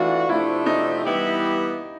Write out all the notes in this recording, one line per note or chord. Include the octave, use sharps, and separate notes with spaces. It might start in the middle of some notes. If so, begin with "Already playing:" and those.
Already playing: E3 A3 D4 F4 F#4
C3 F3 A3 D4 E4
D#4
E3 G3 B3 E4 G4